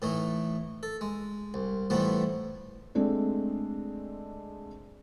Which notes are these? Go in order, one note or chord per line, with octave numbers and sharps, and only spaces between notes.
A2 E3 A3 D#4
A4
G#3
C2
A2 E3 F3 G3 A3 B3
G#3 A3 C4 D4